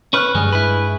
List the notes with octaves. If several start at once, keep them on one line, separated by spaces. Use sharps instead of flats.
C#4 B4 C#6 F6 F#6
G2 G3 G#3
E4 B4